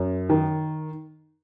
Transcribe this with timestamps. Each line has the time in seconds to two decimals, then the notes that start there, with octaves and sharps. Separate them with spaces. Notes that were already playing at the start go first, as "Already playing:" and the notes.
Already playing: F#2
0.29 D#3